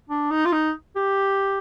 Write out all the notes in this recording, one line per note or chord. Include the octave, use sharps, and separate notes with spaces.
D4
D#4
F4
D#4
G4